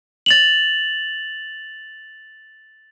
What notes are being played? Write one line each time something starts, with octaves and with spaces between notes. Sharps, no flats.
A6 F7 F#7